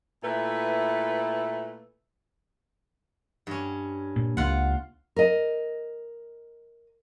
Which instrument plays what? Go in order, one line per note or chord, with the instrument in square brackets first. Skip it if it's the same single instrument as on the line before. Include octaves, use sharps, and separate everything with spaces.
[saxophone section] A#2 A3 E4 B4
[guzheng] G2 C#4
[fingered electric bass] A#2
[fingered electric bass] C#2 A#3 [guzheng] F4 F#5
[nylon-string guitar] A#4 D#5